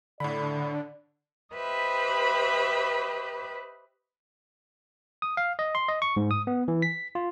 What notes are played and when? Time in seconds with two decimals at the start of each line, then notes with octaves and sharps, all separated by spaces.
0.20 A2 D3 D5 B5
1.53 G4 B4 C5 D#5 E5 B5
5.22 D#6
5.37 F5
5.59 D#5
5.75 C6
5.88 D#5
6.02 C#6
6.17 G#2
6.31 D#6
6.47 B3
6.68 E3
6.82 B6
7.15 F4